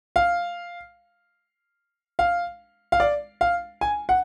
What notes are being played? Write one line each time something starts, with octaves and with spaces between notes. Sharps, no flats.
F5
F5
F5
D5
F5
G#5
F#5